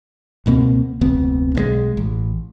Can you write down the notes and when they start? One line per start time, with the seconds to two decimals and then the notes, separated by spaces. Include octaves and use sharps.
0.46 C#2 B2 A#3 C4
1.01 F1 D2 B3 C4
1.55 B1 D#3 G#3
1.97 A1